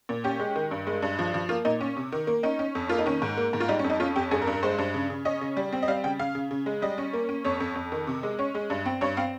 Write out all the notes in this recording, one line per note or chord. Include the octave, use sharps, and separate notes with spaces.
A#2
C#4 G4
G#3
D#3
G2
G#3
G2
F3
F3
A#3 F4
A#2 D#4
C#4
C3
D#3
A#3
C#4 D#4
C#4
F2
A#3 F4
D#4
D#3 C#4
G#2
A#3
G#2
F4
G3 D#4
C#4
F2
D#4
C#4 F4
F2 G4
G2 G#4
A#4
G2
A#4
G#3 C5
G2
C#3
C#3
C#4 D#5
C#3
G3
C4
D#5
G3 F5
C#3 G5
C#3 F5
C#3
C#3
G#3
G3 D#5
C#4
A#3
C#4
F2 C#5
F2
F2
D#3
C3
G#3
C#4 C#5
G#3
G2
C4
G2 C#5
C4 F5